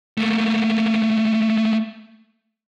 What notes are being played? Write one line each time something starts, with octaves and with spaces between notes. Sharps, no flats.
A3 A#3